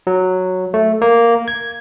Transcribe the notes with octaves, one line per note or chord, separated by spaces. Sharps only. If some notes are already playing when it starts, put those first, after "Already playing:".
F#3
A3
A#3
G#6